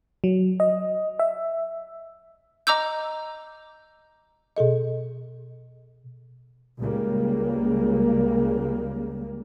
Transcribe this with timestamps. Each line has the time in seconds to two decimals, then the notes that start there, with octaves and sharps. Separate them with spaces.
0.24 F#3
0.60 D#5
1.19 E5
2.67 D#5 A#5 D6 E6 G6
4.57 B2 G#4 A4 D#5
6.78 C#2 C#3 G3 A#3